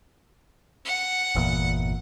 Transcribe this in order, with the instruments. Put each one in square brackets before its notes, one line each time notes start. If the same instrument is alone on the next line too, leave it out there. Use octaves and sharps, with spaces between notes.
[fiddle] F#5
[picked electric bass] G1 E2 A#2